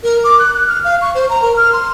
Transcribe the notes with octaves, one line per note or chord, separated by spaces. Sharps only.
A#4
D6
F#6
F#6
F6
F5
C#6
C5
A#5
A#4
F6
C6